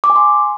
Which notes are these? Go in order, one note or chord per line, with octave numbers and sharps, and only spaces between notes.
D6
G#5
C6